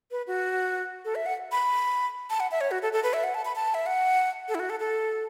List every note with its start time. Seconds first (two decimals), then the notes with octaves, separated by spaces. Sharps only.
0.11 B4
0.27 F#4
1.05 A4
1.15 E5
1.26 F#5
1.52 B5
2.30 A5
2.40 F#5
2.51 E5
2.61 C#5
2.71 F#4
2.82 A4
2.93 A4
3.03 B4
3.13 E5
3.24 F#5
3.34 A5
3.45 B5
3.56 A5
3.74 E5
3.86 F#5
4.49 A4
4.55 E4
4.60 F#4
4.70 A4
4.80 A4